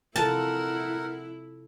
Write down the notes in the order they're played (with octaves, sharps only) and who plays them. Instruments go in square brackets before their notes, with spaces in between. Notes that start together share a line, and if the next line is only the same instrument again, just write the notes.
[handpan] C3 F4 A4 [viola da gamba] E4 [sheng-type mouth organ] A#4 F#5 [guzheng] A5